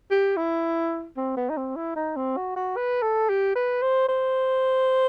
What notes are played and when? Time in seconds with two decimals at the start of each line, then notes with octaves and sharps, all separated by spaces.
0.11 G4
0.37 E4
1.17 C4
1.37 B3
1.50 D#4
1.57 C4
1.76 E4
1.96 D#4
2.16 C4
2.37 F#4
2.56 F#4
2.77 B4
3.02 A4
3.30 G4
3.55 B4
3.82 C5
4.09 C5